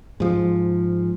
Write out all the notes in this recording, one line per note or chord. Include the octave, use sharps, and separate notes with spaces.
G#2 F3